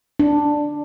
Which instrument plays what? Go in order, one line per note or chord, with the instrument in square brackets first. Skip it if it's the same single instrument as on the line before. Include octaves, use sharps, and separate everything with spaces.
[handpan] D4